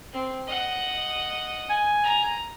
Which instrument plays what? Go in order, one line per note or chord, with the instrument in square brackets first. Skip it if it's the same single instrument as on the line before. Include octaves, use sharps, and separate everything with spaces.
[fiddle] C4
D#5 F#5
[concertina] G#5
[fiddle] A#5